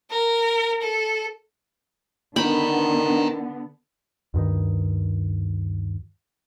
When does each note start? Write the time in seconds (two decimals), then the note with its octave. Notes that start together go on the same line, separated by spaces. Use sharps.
0.11 A#4
0.81 A4
2.36 D3 D#3 B3 G5 A#5 B5
4.34 D2 G2 D#3